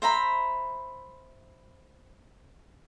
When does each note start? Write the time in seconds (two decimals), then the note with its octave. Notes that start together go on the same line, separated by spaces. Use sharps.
0.02 C5 E5 A#5 B5